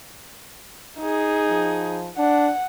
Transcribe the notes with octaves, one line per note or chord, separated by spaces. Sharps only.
D#4 G#4
F3
D4 F#5